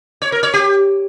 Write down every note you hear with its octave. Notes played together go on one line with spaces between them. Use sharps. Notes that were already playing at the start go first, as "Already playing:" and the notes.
C#5
A#4
C#5
G4